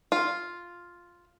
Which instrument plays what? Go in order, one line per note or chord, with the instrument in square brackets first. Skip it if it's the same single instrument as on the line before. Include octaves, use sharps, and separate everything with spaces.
[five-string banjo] F4